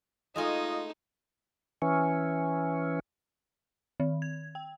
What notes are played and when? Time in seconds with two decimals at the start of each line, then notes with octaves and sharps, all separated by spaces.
0.36 G#3 A3 D#4 F4 D#5 G#5
1.82 E3 C#4
4.00 D#3
4.22 G#6
4.55 G5